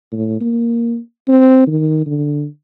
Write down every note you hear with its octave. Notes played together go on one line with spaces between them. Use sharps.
A2
A#3
C4
D#3
D3